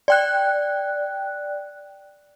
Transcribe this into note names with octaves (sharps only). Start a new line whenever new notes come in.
D5 G5 F#6